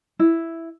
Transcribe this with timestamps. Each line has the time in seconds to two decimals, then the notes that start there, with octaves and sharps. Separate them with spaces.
0.19 E4